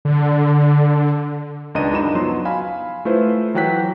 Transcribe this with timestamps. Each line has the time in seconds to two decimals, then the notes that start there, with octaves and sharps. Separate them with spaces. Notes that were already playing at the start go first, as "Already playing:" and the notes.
0.05 D3
1.75 C#2 D#3 D4 D#5 A#5 D#7
1.93 F#2 D4 D#4 F#4 B5 E7
2.15 F3 F#3 B3 C6 E7
2.45 F5 G#5 B5
3.05 A3 E4 F4 B4 C5
3.54 E3 F#3 F#5 G5 F#6 B6